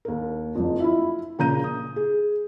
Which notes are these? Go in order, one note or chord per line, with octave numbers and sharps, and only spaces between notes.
D#2 A#4
F#1 F2
E4 F4 E5
A#2 C#3 A#5 G6 D#7
D#6
G#4